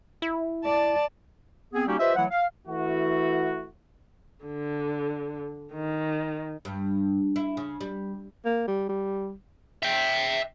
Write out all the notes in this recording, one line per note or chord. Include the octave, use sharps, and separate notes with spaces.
E4
D5 A5
B3 C4 G#4
G3 A#3 C#4 D#4 F#4 G4
F4 G4 B4 C5 D#5 E5
E3 F#3 A3 E4 F#5
F5
E3 A3 E4 F#4
D3
D#3
G2
E4
C#3
G3
A#3
G3
G3
E5 G5